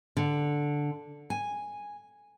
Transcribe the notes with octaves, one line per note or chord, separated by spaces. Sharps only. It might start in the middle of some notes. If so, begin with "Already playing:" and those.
D3
G#5